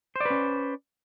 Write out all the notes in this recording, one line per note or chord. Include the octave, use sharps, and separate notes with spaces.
C#4 B4 C5 D5